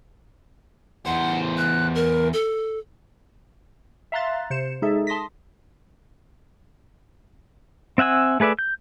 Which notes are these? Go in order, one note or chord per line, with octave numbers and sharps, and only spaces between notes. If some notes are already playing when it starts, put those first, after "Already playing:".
E2 C5 F#5
F#6
A#4
A4
E5 F5 A#5 C6 F#6 A6
C3 C5 C#7 E7
G#3 D#4 G#4 A4 E5
A5 C6 D#6 A#6 B6
C4 E5 F#5 G#5 E6
A3 G#4 B4 D5 E5
G6